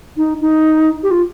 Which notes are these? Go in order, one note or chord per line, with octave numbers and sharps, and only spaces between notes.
D#4
D#4
G4
F4